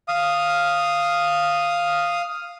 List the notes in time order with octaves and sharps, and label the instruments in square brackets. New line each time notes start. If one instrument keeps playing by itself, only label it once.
[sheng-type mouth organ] F5 D#6